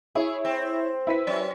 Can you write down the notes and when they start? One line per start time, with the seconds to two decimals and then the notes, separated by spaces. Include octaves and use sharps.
0.15 E4 G#4 C#5
0.45 C4
1.07 E4 B4 B6
1.27 F#3 C#4